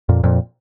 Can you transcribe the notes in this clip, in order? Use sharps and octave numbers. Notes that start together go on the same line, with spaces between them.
F2 A#2
F2 A#2